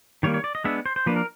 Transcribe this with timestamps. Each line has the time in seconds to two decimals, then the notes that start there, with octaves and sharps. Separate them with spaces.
0.23 D#3 G3 A#3 C#5
0.34 C#5
0.44 D5
0.55 D#5
0.64 G#3 B3 D4 E5
0.86 C5
0.96 C5
1.06 F3 A#3 D4 B4
1.16 A#4